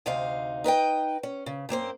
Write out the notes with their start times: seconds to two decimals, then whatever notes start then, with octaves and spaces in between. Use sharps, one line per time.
0.06 D2 C3 D#4 F5
0.64 D#4 B4 D#5 G5
1.23 C#4
1.46 C#3
1.69 F#2 A#3 C4 C5